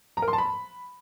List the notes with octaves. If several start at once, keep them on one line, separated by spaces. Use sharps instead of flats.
A#5
A#4
C6
A5
B5